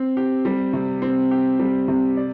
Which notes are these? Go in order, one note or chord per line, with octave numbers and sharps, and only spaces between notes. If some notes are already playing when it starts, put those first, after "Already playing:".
Already playing: C4
G4
G3
C3
C4
G4
G3
C3
D5